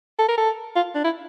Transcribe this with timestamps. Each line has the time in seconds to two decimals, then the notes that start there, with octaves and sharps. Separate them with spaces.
0.19 A4
0.28 A#4
0.38 A4
0.76 F4
0.95 D4
1.04 E4